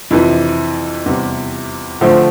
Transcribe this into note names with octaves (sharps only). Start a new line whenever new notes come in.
F2 C3 E3
E2 C3 G3
D3 F3 A3 C4